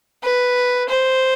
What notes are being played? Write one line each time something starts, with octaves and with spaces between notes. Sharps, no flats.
B4
C5